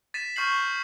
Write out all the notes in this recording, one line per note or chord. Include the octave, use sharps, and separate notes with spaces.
A6 B6 D#7 E7
C#6 F6 G6 A6 C7 F#7